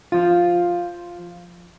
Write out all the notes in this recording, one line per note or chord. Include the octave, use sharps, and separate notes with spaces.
F3 F4